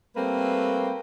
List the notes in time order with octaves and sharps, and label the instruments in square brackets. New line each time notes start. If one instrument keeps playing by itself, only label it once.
[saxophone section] G3 A3 A#3 C4 B4